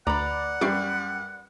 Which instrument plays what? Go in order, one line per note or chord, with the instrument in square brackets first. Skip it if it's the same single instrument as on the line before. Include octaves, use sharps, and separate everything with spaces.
[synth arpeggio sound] D2 [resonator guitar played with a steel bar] B4 D5 [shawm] F#5 [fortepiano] A#5
[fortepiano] F#2 G3 [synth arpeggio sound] C#6 D6 C7